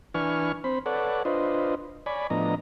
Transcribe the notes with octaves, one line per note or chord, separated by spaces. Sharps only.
E3 D4 B4 G#5 C#6 F6
C4 C5 B5
A4 B4 C#5 D5 F#5
D4 F4 B4 C5 D#5
C#5 D5 G#5 B5
A2 F3 B3 D4 D#5 A#5